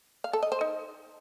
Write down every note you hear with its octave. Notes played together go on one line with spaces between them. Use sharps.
F5
A4
D#5
C5
D#4